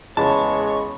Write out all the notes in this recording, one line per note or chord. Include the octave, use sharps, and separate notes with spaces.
E2 C#3 G#3 B3 C#5 A5 C#6